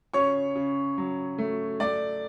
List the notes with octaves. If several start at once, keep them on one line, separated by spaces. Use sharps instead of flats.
C#3 C#5 C#6
C#3
F#3
A3
A3 D5 D6